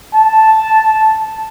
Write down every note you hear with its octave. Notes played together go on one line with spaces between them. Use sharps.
A5